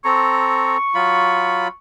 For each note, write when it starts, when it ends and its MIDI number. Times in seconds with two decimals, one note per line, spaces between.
0.05 0.77 60
0.05 0.77 69
0.05 0.77 82
0.05 1.78 85
0.95 1.68 54
0.95 1.68 65
0.95 1.68 83